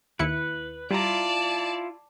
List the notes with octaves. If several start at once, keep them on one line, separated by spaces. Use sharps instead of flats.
D#2 E4 B4 C#7
G3 E4 F4 D5 A5 A#5